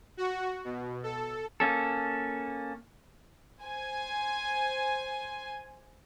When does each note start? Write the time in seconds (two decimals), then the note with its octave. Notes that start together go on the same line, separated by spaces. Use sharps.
0.17 F#4
0.64 B2
1.03 A4
1.60 A#3 C#4 A4
3.61 C5 G#5